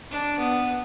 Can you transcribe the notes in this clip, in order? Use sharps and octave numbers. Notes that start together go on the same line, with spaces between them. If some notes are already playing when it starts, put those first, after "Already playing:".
D4
B3